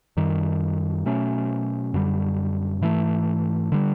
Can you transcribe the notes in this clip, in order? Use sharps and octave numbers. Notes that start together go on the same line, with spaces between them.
F#2 D#3 G3
B2 F#3 A3 C#4
F#2 D3 G3
G#2 E3 A3
D3 G3